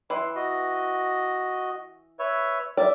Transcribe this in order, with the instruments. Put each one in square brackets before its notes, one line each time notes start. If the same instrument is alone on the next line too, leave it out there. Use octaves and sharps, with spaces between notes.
[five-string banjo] E3 [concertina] C6
[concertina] F#4 D#5
B4 C#5 E5
[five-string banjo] D5 [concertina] E5